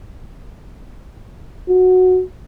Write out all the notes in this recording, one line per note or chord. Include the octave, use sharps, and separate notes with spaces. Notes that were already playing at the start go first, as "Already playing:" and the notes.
F#4